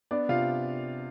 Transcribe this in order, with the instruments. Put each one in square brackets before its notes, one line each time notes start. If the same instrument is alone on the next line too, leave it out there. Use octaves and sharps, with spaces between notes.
[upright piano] B3 D4 D5
C3 F4 F5